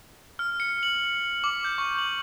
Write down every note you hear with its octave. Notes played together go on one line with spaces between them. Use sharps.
F6
C#7
F#7
D6
G6
C#6
F#7